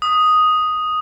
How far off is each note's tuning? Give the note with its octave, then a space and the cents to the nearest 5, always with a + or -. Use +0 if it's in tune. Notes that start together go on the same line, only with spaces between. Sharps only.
D#6 +0